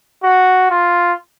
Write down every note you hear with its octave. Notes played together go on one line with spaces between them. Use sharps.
F#4
F4